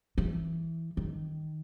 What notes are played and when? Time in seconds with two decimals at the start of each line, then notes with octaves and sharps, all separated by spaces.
0.18 E3
0.97 D#3